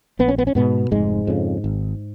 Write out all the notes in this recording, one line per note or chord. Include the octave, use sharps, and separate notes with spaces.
A#1 B3
C#4
B3
C#4
G#2 B2 B3
F1 G#2 G#3
F2 C#3
G#1